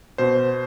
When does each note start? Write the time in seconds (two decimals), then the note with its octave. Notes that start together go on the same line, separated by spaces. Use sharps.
0.18 B2 C5